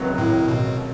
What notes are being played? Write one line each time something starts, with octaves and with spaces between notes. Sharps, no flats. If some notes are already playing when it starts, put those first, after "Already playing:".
Already playing: C#2 C3 D#3 F#3 B3
A2
B2